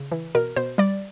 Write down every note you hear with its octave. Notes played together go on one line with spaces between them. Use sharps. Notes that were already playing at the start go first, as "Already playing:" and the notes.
Already playing: C#3
E3
B2 A#4
B2 C5
G3 D5